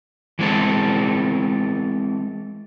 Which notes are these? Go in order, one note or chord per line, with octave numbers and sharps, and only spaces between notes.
E3 G#3 C4 A4